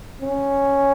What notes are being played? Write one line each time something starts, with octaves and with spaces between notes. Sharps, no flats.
C#4